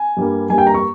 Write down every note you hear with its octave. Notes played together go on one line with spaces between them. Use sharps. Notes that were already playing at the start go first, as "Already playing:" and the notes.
Already playing: G#5
G2 G3 A#3
G2 G3 A#3 G#5
G5
A#5
C#6